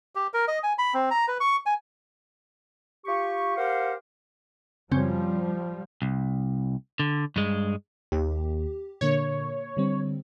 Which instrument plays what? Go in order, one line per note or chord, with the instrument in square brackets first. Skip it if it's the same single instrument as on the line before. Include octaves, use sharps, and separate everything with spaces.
[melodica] G4
A#4
D#5
G#5
B5
C4
A#5
B4
C#6
G#5
[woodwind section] F4 G4 C#6
G4 A#4 C5 F5 F#5
[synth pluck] F#2 C#3 C4 [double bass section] F3 G3
[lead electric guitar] C2
D3
G2 G#3
[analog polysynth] D#2 [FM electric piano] G4
[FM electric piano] A#2 D3 A#3 [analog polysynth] C#5
[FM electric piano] D3 G3 C4